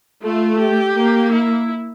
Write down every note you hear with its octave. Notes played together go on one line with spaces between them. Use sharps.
A3 F4
G4
A#3
E4